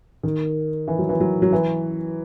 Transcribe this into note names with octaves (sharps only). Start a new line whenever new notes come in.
D#3
E3
F#3
E3
F#3
F#3
E3